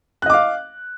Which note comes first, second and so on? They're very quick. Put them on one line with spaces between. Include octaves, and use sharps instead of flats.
F#6 D#5 D6 F5